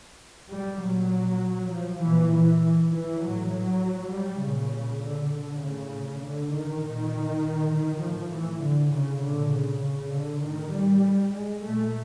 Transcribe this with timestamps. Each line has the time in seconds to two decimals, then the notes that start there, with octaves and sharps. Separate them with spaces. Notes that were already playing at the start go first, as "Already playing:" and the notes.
0.50 G3
0.81 A#2 F#3
1.72 F3
2.01 A#2 E3
2.32 E3
2.91 E3
3.21 A2 F#3
3.51 F#3
4.12 G3
4.41 A#2 C#3
5.02 D3
5.32 D3
5.62 A2 C#3
6.22 D3
6.53 D#3
6.83 A#2 D#3
7.73 D#3
8.03 A2 F3
8.33 E3
8.63 D3
8.94 C#3
9.23 A#2 D3
9.53 C#3
9.84 C#3
10.13 D3
10.43 A2 D#3
10.73 G3
11.33 G#3
11.63 A#2 A3